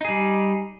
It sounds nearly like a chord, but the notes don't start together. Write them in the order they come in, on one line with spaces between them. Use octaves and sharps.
D#4 G#4 G3